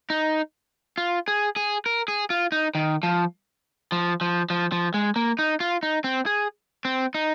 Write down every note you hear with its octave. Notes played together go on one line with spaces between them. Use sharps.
D#4
F4
G#4
G#4
A#4
G#4
F4
D#4
D#3
F3
F3
F3
F3
F3
G#3
A#3
D#4
F4
D#4
C4
G#4
C4
D#4